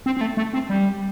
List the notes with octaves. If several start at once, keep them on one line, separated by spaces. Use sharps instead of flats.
C4
C4
A3
A3
C4
G3